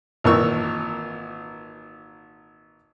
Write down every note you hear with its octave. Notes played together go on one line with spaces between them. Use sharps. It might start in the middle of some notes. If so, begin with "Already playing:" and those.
G#1 A#2 E3 A#4 C#6 E6